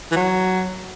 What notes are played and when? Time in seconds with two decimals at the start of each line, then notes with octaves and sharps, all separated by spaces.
0.12 E3
0.16 F#3